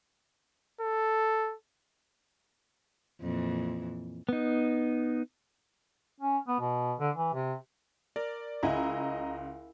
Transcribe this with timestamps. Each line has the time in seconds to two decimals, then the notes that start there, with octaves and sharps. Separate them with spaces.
0.81 A4
3.20 F2 A#2 E3
4.29 B3 D#4
6.20 C#4
6.47 B3
6.60 B2
7.00 D3
7.15 E3
7.34 C3
8.16 A#4 D5
8.63 C#2 E4 D#5 F#5 G#5 A#5